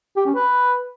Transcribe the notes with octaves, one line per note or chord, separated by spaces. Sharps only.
G4
C#4
B4